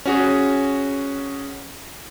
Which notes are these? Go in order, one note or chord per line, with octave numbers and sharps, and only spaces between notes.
C#4 F#4 G#4